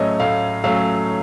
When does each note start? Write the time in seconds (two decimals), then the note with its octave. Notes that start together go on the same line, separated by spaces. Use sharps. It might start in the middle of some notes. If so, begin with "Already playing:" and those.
Already playing: A2 F#3 A3 C#4 C#5 D#5
0.20 A2 F5
0.64 F#3 A3 C#4 F5